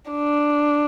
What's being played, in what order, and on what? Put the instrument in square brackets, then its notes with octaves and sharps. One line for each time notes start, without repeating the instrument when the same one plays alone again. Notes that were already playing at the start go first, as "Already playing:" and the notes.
[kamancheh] D4